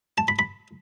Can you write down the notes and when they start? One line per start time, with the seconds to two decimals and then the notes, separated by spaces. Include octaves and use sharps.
0.18 A5
0.28 B5
0.39 B5